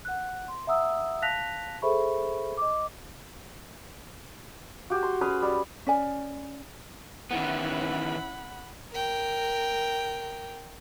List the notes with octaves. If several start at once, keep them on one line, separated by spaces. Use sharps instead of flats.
F#5 F#6
C6
E5 F#5 A#5 D#6 E6
F5 A5 F#6 A#6 B6 F7
G#4 A4 C5 E5 B5 C#6
D#5 D6
F#4 G4
C6
C#4 G#4 B4 B5
G3
C#4 D5 G#5
D#3 E3 B3 C#4 E4 F#5 B5
A#4 G5